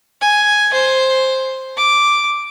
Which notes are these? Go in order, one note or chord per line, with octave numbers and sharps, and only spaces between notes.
G#5
C5
D6